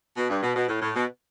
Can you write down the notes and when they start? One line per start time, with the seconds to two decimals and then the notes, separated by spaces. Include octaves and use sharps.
0.17 B2
0.30 G2
0.43 B2
0.55 B2
0.68 A2
0.81 A2
0.95 B2